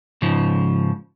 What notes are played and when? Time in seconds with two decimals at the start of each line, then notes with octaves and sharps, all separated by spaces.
0.22 G#2 C#3 F3